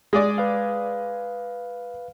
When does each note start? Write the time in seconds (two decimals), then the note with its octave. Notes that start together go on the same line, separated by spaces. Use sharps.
0.13 G#3 G#4 D5
0.38 B4 F5